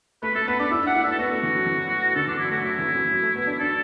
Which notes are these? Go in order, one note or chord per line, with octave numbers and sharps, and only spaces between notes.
A3 B4
A3 A4
B3 B4
D4 D5
E4 E5
D4
F#5
E4
D4 E5
A4
B3 F#4
A3
E3
F#3
E3
D3 A4
E3 D4
F#3 E4
A3 F#4
F#3 E4
E3
E3
F#3
A3
B3
D4
D4 A4